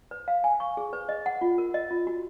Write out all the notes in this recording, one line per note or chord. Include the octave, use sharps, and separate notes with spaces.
B4
F5
G#5
C#6
G#4
B4
D#5
F#5
F4
A#4
D#5
F4
F#4